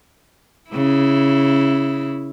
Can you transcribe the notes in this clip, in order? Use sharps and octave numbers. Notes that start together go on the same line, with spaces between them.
C#3 E4